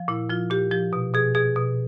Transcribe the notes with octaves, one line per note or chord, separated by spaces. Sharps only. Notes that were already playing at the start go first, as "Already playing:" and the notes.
Already playing: F3
A#2 E4
F3 F4
A#2 G4
F3 G4
B2
B2 G#4
B2 G#4
B2